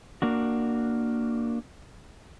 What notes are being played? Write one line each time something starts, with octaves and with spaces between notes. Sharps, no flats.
A#3 D4 F#4